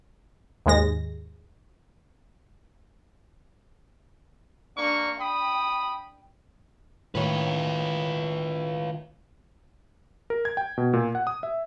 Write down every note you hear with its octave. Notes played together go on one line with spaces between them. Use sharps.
D#2 G#2 G#3 A#6
A#3 D4 C#6
G5 B5 D#6
A2 D#3 F4 B4 C#5
A#4
G#6
G5
B2
A#2
F#5
D#6
E5